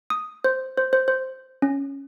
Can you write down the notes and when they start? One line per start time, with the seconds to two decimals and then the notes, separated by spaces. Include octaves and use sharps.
0.10 D#6
0.44 C5
0.78 C5
0.93 C5
1.08 C5
1.62 C#4